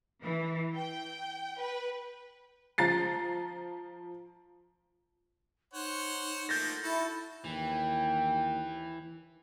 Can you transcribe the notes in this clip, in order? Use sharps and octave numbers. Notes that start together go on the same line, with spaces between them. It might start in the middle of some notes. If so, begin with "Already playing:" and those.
E3
G5
B4
F3 A#5 A6 C7
D#4 C5 C#5 F#5
F3 A3 A#3 G6 A6 A#6
E4 F#4 A4
D#2 E3 G5